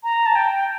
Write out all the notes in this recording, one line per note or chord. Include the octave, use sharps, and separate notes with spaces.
A#5
A5
G5